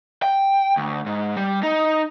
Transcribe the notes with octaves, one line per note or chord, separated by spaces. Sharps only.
G5
D2
G#2
G3
D#4